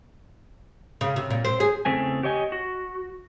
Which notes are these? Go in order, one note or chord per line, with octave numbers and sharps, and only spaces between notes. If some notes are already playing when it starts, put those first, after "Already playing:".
C#3
C3
A#2
C4
G#4
E2 C#3 A3 C4 G#5
G4 C#5 D#5 G#5
F#4